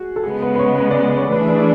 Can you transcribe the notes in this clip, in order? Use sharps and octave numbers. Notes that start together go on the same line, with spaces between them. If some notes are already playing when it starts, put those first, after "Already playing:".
Already playing: F#4 G#4
A4
C#3 G#3 B3 G#4
B4
B4
C#5
B4
D5
C#5
E3 A3 D4 G#4 B4
B4